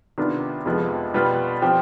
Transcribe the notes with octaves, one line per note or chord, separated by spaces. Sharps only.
C3 D#3 B3 D4 F4
F2 C3 F3 G#3 B3
B2 G3 B3 F4 B4
F3 C4 G4